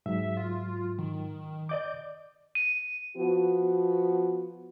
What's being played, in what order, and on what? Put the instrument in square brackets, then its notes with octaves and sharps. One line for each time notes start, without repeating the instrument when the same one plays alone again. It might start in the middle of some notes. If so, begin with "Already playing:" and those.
[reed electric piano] G#2 F#3 [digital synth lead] E5
[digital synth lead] F4
D#3
[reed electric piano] D5 D#5 D6 [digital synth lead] G6
[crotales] D#7
[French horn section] F3 B3 F#4